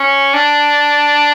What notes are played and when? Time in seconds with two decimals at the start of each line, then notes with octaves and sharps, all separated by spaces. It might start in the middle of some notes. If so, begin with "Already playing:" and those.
Already playing: C#4
0.34 D4